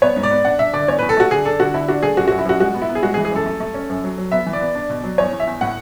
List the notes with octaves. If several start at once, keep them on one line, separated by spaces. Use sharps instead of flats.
B3 C#5
G#2
D5
B3
D4 F#5
D4 E5
D3 D5
E2 C#5
E2 B4
A4
A3 F#4
D3 G#4
D4 A4
D3 F#4
D3 E4
D4 F#4
A3 G#4
F#2 F#4
F#2 F#4
E4
F#2 F#4
G#3 F#4
B3
E4
B3
G#4
G#3 F#4
G#4
E3
G#4
F#2 A4
A3
A3
C#4
F#2
F#3
F#3
B3 E5
E3
D5
B3
D4
B2
F#3
E2 C#5
E2
E5
E2
A2 F#5